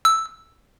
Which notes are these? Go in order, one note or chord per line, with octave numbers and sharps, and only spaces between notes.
E6